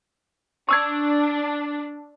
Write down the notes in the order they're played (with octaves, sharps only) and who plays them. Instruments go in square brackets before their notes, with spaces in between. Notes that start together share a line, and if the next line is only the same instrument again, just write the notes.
[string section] D4 [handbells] C#6 E6 G#6